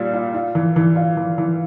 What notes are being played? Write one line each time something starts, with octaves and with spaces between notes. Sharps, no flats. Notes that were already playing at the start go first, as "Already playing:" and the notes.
Already playing: A#2 G3 F4
F4
F4
E3
E3
F4
E3
E3